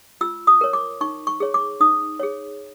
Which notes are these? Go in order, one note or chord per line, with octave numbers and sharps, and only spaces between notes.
F4 E6
D#6
A#4 C#5
D6
D#4 C#6
C#6
G#4 C#5
D6
D#4 D#6
G#4 C#5